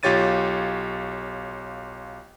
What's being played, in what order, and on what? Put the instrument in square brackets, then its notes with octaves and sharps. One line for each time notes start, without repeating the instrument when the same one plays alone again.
[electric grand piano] B1 F4 G4 C#5 A6 D#7